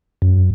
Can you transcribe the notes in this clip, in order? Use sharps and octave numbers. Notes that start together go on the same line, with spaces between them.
F#2